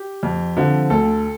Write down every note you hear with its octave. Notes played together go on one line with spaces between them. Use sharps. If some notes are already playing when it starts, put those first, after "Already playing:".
Already playing: G4
F2
D3 F3 C4
D2 A4